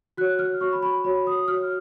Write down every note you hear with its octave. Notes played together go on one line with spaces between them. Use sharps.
F#4 C#5 F#6
F6
F#4 C#5 C#6
B5
B5
F#4 C#5 B5
D#6
F#4 C#5 F6